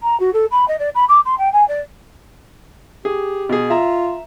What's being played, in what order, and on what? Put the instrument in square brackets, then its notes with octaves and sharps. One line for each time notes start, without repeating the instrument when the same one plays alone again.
[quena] A#5
F#4
A4
B5
D#5
D5
B5
D6
C6
G5
G#5
D5
[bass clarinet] G4 [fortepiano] G#4
[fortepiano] B2 G#4
[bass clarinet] F4 [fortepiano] E5 A#5